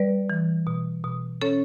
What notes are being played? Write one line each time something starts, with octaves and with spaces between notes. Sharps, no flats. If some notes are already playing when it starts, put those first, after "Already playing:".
Already playing: G3 B4 D5
E3
B2
B2
C#4 A4 C#5